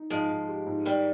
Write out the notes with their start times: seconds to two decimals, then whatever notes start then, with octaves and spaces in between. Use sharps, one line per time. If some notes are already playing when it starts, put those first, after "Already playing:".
Already playing: D#4
0.10 G#2 F3 G#3
0.30 G#2
0.48 G4
0.66 G#2
0.85 D#3 G3 D#4